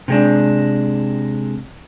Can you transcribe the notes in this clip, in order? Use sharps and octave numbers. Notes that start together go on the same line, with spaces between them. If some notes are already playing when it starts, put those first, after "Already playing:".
C3 G#3 D4